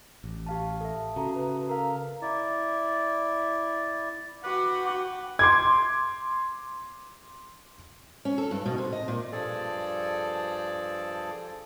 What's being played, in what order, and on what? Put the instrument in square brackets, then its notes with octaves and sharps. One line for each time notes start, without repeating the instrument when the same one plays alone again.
[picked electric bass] A1
[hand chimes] G4 F5 A5
A4 E5
[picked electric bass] C#3 [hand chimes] F#4 A4 [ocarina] A#5
[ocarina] B4
[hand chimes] A#4 F5 [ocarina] A#5
[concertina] E4 D5
[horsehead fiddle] F#4 [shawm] B4 [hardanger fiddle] F#5 G5 [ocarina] D6
[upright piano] C6 D6 G#6
[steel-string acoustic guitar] C#4
A4
G2
B2
C3
D#5
A#2
[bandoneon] G2 F3 G#4 A4 D5